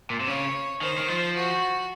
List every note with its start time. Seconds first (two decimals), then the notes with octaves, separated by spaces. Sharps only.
0.10 A#2
0.20 C3
0.27 C#3 C#5
0.81 D#3 C5
0.98 D#3
1.08 F3
1.36 F#4